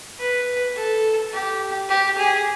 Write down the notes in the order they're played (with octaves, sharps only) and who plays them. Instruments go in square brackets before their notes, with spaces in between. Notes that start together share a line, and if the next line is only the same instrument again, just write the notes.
[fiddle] B4
A4
G4
G4
G#4